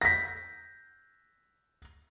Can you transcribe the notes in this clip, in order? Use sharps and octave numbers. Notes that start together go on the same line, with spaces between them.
A#6 B6